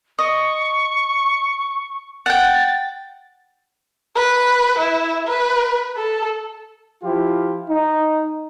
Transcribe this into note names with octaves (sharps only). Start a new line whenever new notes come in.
D#5 C#6
F#5 G5 A6
B4
E4
B4
A4
F3 E4 F4 G4
D#4